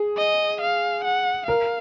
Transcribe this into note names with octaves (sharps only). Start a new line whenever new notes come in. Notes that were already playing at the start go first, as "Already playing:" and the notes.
Already playing: G#4
D#5
F5
F#5
A#4 F5